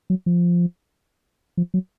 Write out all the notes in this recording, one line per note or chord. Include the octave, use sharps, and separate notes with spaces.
F#3
F3
F3
F#3